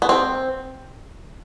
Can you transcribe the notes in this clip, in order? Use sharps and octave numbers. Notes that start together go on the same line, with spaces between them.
B3
C4